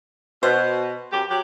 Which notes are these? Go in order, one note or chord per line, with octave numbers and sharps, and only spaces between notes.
B2 C5
F#2 G4
F#3 G4